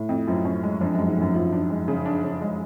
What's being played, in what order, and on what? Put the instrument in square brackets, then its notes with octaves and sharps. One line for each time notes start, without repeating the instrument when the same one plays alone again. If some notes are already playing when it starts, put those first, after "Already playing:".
Already playing: [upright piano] A2
[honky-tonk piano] F2
[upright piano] F#2 [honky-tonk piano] F3
[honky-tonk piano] C#4
G#3
[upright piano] F2 [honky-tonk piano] D4
[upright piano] F#2 [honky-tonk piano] G#3
[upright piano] G#2
[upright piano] F#2 [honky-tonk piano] A2
[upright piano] F#2 [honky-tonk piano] F3
[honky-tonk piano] D4
G#3
C#3
D4
C#3
G#3